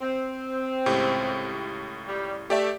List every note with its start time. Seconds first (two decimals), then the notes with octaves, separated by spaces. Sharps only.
0.01 C4
0.86 C#2 A2 G4
2.08 G3
2.50 A3 G4 D5 E5